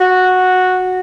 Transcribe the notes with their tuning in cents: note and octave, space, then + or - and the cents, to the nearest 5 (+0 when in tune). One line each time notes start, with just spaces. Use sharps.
F#4 -5